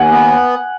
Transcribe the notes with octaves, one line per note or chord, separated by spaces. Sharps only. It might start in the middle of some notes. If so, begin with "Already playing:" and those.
Already playing: D#2 F#5 G#5
B3